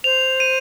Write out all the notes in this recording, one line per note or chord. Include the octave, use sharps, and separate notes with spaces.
C5 F7
D#7